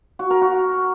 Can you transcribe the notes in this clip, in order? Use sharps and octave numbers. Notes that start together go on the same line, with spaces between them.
F#4
A#4
F#4